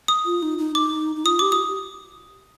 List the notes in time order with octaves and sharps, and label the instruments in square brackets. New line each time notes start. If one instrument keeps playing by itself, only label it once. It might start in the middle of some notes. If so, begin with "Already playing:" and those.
[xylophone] D#6
[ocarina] F4
D#4
D#4
[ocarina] D#4 [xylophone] D6
[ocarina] D#4
[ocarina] F4 [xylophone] D#6
[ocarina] G4 [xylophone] D6
[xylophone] D#6